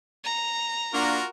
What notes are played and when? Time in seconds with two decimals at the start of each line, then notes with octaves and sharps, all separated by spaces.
0.24 A#5
0.94 A#3 D4 F4 F#4 A#4